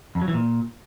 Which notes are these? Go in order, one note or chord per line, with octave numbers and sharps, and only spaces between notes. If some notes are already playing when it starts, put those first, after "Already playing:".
F2
F#3
E3
A#2